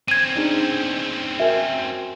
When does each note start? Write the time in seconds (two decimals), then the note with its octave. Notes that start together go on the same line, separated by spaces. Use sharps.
0.08 C4 C#4 G#6 D#7
0.36 D4 D#4 G#4
1.40 F#4 A#4 E5 G#5